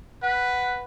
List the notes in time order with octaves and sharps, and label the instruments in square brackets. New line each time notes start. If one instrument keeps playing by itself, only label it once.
[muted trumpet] B4 [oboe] F#5